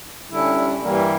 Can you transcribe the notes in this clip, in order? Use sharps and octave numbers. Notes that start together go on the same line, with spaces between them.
D3 G3 C#4 E4
G2 E3 G3 A#3